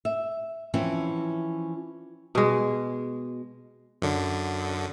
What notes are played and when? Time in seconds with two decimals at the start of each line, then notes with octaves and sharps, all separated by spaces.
0.05 E5
0.74 E3 F3 C4 C#4 E4
2.35 B2 G#3
4.02 F#2 D3